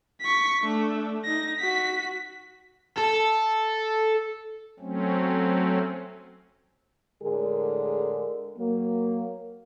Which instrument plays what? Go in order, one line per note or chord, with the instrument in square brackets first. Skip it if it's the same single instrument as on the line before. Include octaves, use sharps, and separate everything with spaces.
[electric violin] C#6 B6
A3 D4
D#4 A#6
F#4 B6
[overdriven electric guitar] A4
[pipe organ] F#3 A3 C4 C#4
[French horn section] A2 D3 G#3 G#4 A#4
F#3 A#3